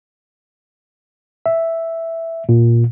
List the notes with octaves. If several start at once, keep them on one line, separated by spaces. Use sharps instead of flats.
E5
A#2